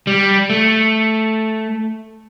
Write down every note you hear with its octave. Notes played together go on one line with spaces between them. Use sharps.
G3
A3